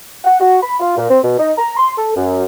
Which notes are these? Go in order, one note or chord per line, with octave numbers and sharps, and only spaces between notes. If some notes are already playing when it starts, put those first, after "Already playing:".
F#5
F#4
B5
F4
A#2
C4
B2
D#4
A#5
C6
A4
F#2